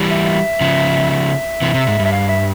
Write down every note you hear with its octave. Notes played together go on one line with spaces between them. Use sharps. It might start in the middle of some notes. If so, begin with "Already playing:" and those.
Already playing: E3 G3
E5
C#3 F3
E5
C3 E3
C3
G#2
G2
E5
F5
E5